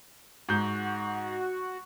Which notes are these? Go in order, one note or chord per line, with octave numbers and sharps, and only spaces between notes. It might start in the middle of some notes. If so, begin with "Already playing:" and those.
G#2 F#4 G6